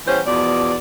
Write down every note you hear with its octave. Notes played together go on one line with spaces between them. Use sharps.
E3 G3 B3 C#4 B4 C5
E2 B2 F3 D5